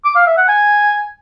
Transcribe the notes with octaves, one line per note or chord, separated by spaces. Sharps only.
D6
F5
E5
F#5
G#5